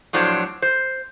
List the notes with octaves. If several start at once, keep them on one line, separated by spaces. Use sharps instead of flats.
A2 F3 F#3 D4 C5
C5